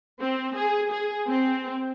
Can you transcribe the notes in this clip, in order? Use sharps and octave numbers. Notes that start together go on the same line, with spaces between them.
C4
G#4
G#4
C4